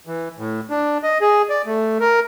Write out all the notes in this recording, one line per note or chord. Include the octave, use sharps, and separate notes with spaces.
E3
A2
D4
D#5
G#4
D5
A3
A#4